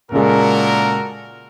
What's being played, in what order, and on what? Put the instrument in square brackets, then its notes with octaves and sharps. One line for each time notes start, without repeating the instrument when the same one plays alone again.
[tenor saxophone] A#2 [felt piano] C#3 G#3 [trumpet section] F#4 A4 A#4